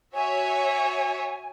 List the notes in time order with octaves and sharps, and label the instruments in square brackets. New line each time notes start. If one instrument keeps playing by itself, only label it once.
[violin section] F#4 C#5 E5 [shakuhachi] G#5